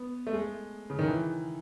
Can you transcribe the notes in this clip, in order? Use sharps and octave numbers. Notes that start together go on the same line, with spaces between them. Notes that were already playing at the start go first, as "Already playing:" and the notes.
Already playing: B3
A3
G#3
C#3
D#3
E3